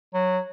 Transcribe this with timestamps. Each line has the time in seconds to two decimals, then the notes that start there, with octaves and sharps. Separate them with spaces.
0.14 F#3